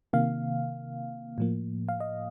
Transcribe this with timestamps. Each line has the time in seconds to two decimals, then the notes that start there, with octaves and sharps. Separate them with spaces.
0.13 C3 D#3 A#3 F5
1.38 A2 F3 A#3
1.89 F5
2.00 D#5